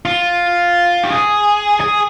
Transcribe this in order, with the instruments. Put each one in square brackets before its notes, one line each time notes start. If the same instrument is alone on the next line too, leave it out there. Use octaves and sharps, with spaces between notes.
[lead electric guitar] F4
G4
G#4
G#4